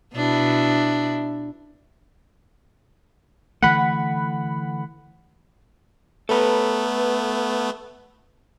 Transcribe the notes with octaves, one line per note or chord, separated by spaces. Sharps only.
B2 D4 E4
D3 E3 A3 F#5 B5
A3 B3 A4 B4 A#5